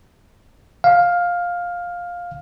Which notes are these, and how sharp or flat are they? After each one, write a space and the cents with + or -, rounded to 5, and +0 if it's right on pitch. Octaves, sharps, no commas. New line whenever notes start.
F5 +10